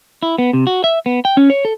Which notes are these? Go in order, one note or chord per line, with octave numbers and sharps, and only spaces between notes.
E4
B3
C3
F#4
E5
B3
G5
C#4
C#5
A4